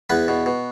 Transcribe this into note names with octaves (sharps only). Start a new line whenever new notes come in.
E2 B3 B4
B2
B2